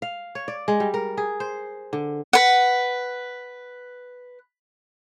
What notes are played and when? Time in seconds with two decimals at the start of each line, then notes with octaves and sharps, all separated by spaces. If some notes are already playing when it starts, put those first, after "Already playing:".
0.02 F5
0.35 C#5
0.48 D5
0.68 G#3
0.80 G3
0.94 A#4
1.17 G#4
1.40 C5
1.93 D3
2.33 B4 F#5